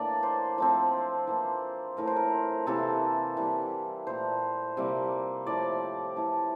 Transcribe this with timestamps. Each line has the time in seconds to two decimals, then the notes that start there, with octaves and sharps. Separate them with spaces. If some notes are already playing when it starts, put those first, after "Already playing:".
Already playing: A2 E3 A#3 D4 D5
0.23 C5
0.58 F3 A3 C4
1.27 E3 A#3 E4
1.97 A2 E3 A3 A#4
2.07 C5
2.16 A#4
2.67 C3 E3 A#3 E4 A4
3.37 E3 G3 A#3
4.07 A#2 A3 E4 C5
4.77 C3 G3 A#3 E4
5.46 A2 F3 C4 E4 D5
6.16 E3 A3 E4